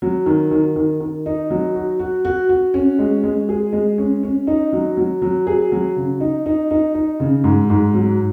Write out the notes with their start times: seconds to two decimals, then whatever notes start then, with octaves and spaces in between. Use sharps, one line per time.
0.02 F#3
0.26 D#3
0.51 D#3
0.76 D#3
1.00 D#3
1.26 D#4
1.50 F#3
1.75 F#4
1.99 F#4
2.25 F#4
2.49 F#4
2.74 C#4
2.99 G#3
3.24 G#3
3.49 G#4
3.73 G#3
3.98 C#4
4.23 C#4
4.47 D#4
4.72 F#3
4.97 F#3
5.22 F#3
5.47 G#4
5.72 F#3
5.96 C#3
6.20 D#4
6.46 D#4
6.71 D#4
6.94 D#4
7.20 C#3
7.44 G#2
7.70 G#2
7.94 F#3